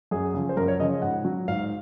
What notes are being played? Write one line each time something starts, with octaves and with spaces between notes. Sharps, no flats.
F#2 G#4
C#3 F3
C5
F#2 A#4
C#5
C#3 F3 D#5
G#2 F#5
F#3
G#2 F5